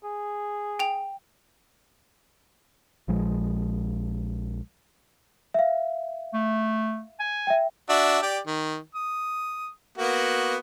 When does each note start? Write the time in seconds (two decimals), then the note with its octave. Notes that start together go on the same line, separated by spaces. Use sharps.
0.04 G#4
0.79 G5 F7
3.08 A#1 F3 G#3
5.54 E5 F5
6.34 A3
7.20 G#5
7.47 E5 G5
7.89 D4 F#4 E5
8.22 G4 D5
8.47 D#3
8.95 D#6
9.98 A#3 B3 F#4